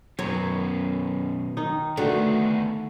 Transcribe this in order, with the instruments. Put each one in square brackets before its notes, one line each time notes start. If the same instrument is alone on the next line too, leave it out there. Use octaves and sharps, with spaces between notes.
[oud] F#2 [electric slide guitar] B2 D#3 B3 [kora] C#5
[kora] D#3 D#4
[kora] D3 F#4 [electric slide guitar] D#3 B3 D4 [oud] A3